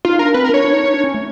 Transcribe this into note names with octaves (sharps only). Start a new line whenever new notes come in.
D#4 F4
D4 A#4
C4 B4
A#4
D4 C#5
D4
D#4
D#4
D4
C#4
A3